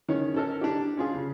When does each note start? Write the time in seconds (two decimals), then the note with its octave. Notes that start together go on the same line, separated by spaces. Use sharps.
0.09 D#3 C#4 G#4 C#5
0.34 C#4 A4 A#4
0.61 D4 G4
0.97 C#4 F4 G#4
1.14 C#3